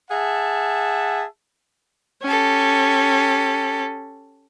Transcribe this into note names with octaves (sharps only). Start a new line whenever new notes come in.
G#4 E5 F#5 A5
C#4 G4 A4